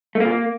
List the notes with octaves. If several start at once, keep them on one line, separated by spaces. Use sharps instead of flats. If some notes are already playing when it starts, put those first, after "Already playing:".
A3
A#3
A#2
A#3